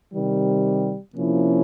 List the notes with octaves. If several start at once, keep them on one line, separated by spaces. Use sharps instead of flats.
C3 D#3 G3
C3 F3 A#3 C#4 E4